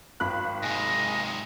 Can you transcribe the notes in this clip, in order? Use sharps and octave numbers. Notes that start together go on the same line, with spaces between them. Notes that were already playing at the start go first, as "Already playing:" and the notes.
G#1 F5 G5 B5 F#6
G#2 C3 G#4 D#5 G#5